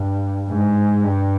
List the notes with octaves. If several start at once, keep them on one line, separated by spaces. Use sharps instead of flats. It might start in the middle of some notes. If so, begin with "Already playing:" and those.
Already playing: G2
G#2
G2